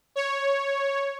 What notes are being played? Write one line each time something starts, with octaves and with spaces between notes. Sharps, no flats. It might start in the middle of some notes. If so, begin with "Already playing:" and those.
C#5